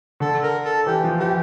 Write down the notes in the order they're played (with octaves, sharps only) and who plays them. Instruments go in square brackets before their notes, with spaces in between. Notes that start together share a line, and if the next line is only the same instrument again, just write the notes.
[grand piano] D3 [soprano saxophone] A4
[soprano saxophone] A#4
A4
[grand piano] E3 [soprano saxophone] G4
[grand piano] F3
[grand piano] E3 [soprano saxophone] G4